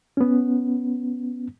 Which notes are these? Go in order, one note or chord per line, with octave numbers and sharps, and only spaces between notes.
B3 C#4